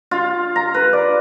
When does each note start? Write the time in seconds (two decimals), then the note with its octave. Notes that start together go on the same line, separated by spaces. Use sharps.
0.11 F4
0.56 A#5
0.74 B4
0.93 D5